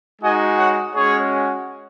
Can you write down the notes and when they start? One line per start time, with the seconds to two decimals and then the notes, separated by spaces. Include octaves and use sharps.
0.22 G#3 D#4 F#4 D#5 G#5
0.58 C#5 F#5
0.95 G#3 C#4 F#4 G#4 C#5